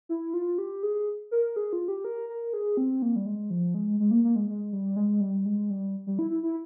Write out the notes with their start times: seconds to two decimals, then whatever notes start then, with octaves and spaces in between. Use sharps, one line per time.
0.09 E4
0.34 F4
0.58 G4
0.83 G#4
1.31 A#4
1.56 G#4
1.73 F4
1.88 G4
2.05 A#4
2.29 A#4
2.53 G#4
2.77 C4
3.02 A#3
3.16 G3
3.26 G#3
3.50 F3
3.74 G#3
4.00 G#3
4.11 A#3
4.24 A#3
4.36 G#3
4.49 G#3
4.73 G3
4.96 G#3
5.21 G3
5.45 G#3
5.70 G3
6.07 G3
6.19 E4
6.31 E4
6.43 E4